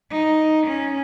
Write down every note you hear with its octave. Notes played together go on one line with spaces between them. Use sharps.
D#4
C#4